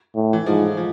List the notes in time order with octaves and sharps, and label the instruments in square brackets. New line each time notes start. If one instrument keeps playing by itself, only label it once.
[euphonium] A2
[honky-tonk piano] E3
[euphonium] G#2 [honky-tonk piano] F3
[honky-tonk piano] F3